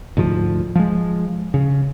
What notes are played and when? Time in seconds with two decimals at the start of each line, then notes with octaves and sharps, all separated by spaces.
0.17 D2 G#2 F3
0.75 F3 G#3
1.54 C#3